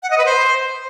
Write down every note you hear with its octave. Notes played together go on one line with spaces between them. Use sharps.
F#5
D#5
B4
C5